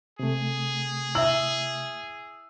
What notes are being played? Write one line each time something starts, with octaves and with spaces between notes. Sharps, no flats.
C3 A3 G#4
E4 E5 E6 F#7